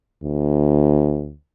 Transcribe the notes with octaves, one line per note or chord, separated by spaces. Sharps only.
D2